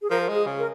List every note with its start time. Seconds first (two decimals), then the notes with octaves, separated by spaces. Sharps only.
0.02 G#4
0.10 F3 A#4
0.29 G#3
0.35 G#4
0.46 C#3
0.59 A#4